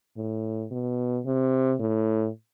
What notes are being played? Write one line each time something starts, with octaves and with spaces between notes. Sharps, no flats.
A2
B2
C3
A2